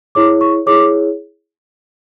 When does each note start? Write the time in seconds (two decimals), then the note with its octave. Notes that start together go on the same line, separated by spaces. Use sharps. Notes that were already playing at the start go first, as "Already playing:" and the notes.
0.15 E4 G#4 C#5 D6
0.41 C#6
0.66 E4 G#4 C#5 D6